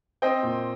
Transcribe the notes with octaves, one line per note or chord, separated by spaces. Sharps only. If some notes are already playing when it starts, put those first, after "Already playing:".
C4 D#5 G5
A#2